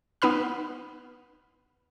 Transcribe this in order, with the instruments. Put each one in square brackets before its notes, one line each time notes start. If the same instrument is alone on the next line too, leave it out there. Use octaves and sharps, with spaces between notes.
[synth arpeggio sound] B3 D#4 B4 B5 F6